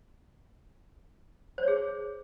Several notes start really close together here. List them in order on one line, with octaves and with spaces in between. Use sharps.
C5 C#5 G#4